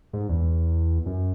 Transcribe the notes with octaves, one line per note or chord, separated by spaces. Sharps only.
G#2
E2
F#2